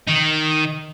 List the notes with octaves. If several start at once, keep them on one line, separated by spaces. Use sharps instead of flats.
D#3 D#4